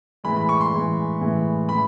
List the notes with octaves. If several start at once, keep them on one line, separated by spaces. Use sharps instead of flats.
A2 E3 G#3 B5
B5
C#6
C6
A2 E3 G#3
A2 E3 G#3
A2 E3 B5